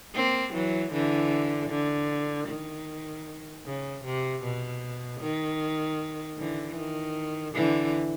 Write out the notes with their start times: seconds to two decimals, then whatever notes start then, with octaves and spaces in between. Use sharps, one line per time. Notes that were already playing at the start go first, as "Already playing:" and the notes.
0.14 A#3 C4
0.54 E3 F#3
0.93 D3 E3
1.70 D3
2.48 D#3
3.66 C#3
4.04 C3
4.44 B2
5.21 D#3
6.38 D3 E3
6.77 D#3
7.54 D3 E3